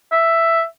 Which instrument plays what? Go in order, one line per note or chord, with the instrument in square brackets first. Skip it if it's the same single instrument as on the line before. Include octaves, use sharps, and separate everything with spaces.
[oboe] E5